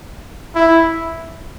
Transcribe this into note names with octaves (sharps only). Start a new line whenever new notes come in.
E4